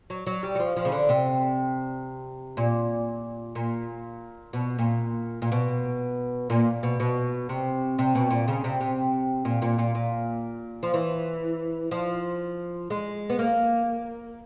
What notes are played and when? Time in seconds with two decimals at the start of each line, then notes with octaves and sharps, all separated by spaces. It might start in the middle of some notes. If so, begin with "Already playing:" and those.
0.10 F#3
0.27 F#3
0.43 G3
0.55 F#3
0.59 F3
0.76 F3
0.85 C#3
0.92 D3
1.09 C3
2.57 A#2
3.55 A#2
4.53 B2
4.79 A#2
5.42 A#2
5.52 B2
6.50 A#2
6.83 B2
7.00 B2
7.49 C3
7.99 C3
8.15 B2
8.30 A#2
8.48 C#3
8.64 C3
8.81 C3
9.45 A#2
9.62 A#2
9.78 A#2
9.95 A#2
10.83 F3
10.94 E3
11.91 F3
12.90 G#3
13.30 B3
13.39 A#3